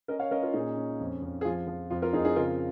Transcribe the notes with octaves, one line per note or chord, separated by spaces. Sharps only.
C#4 A#4 D#5
C#5 F5
C#4 A#4 D#5
F4 A#4
A#2 D#4 G#4
C#4
F2
F2
G#4
F3 F4
F3
F2 F4
F4 A#4
F2 D#4 G#4
D#4 G#4
C#3 F4 A#4